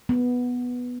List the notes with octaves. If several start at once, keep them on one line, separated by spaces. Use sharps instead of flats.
B3